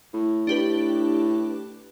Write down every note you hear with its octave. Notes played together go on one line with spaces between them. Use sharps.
A2
D4 G4 B4